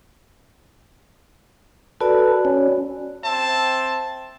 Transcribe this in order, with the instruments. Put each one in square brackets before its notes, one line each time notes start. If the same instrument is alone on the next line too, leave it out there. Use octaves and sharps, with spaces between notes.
[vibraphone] F#4 D5 [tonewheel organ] A4 B4
[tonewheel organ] C#4
[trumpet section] C4 E5 A5